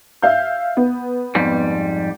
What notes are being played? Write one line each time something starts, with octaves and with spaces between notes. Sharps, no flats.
E5 F5 G6
B3
F2 G#2 G3